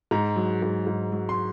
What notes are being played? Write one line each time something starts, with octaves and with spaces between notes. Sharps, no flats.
G#2 A#5
F#3
G#2
G#2
F#3
C6